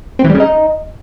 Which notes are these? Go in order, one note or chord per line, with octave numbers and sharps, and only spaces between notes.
C4
E3
G3
C#3
D#4